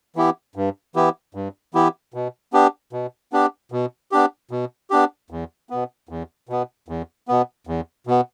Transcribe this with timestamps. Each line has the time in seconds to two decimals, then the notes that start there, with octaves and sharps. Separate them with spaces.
0.16 E3 B3 E4 G4
0.56 G2
0.95 E3 B3 E4 G4
1.35 G2
1.74 E3 B3 E4 G4
2.14 B2
2.53 B3 D4 G4
2.93 B2
3.33 B3 D4 G4
3.72 B2
4.12 B3 D4 G4
4.51 B2
4.90 B3 D4 G4
5.30 E2
5.70 B2 B3
6.09 E2
6.49 B2 B3
6.88 E2
7.28 B2 B3
7.67 E2
8.07 B2 B3